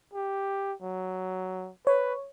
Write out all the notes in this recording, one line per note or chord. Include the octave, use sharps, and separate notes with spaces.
G4
F#3
B4 C#5